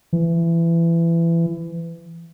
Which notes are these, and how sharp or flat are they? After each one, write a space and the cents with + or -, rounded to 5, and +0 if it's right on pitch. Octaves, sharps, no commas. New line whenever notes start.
E3 +25